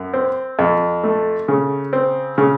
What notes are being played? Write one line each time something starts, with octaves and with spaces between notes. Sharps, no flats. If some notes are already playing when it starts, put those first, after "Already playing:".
Already playing: F#2
C4
F2
A3
C#3
C4
C#3